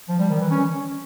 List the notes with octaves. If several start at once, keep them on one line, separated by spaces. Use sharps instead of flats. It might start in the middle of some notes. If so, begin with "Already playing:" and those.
F3
G3
D#3
E3
C#4